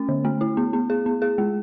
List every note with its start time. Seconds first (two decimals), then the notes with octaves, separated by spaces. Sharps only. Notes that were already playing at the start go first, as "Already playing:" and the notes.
Already playing: A3 C#4
0.09 D3
0.25 A3
0.41 E4
0.57 B3
0.73 B3
0.90 G#4
1.06 B3
1.22 G#4
1.38 G#3